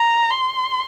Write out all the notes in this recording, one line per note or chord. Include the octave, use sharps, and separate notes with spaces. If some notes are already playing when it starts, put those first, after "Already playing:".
Already playing: A#5
C6